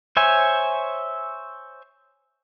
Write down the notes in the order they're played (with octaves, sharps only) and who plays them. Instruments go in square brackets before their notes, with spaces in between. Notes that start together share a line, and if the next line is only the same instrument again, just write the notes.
[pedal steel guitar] C5 C#5 E5 G#5